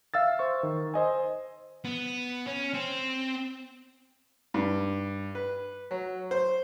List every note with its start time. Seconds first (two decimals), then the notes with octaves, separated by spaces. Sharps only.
0.14 E5 F5 E6 A6
0.39 C5 C#6
0.63 D#3
0.94 C5 D#5 G#5
1.85 B3
2.47 C#4
2.73 C4
4.54 G2
5.35 B4
5.91 F#3
6.31 C5